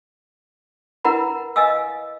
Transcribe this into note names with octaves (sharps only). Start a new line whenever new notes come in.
E4 A#4 B4 F#5 A#5 B5
B4 D#5 F5 G#5 D#6 E6